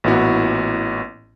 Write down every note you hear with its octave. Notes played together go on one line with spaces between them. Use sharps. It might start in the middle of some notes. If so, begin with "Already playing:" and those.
A1 A#2 B3 E4 F#4